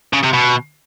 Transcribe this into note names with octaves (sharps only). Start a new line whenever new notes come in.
C#3
C3
B2